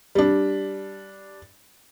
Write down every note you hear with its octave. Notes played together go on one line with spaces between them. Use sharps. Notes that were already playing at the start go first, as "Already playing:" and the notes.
G3 D4